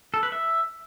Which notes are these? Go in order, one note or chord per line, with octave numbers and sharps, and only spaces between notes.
A4
B4
E5